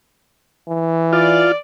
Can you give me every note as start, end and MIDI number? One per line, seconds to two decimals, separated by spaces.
0.68 1.51 52
1.13 1.52 65
1.13 1.56 74